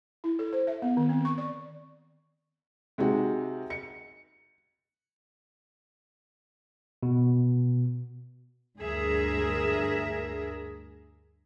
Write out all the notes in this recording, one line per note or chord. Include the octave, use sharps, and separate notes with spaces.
E4
A4
C5
E5
B3
D#3
C4
C#6
D5
C3 G#3 D#4 F#4
C#7
B2
D2 G2 G#4 A#4 E5